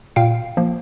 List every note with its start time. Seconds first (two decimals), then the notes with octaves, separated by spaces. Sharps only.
0.16 A#2 F5 G5
0.57 F3 A#3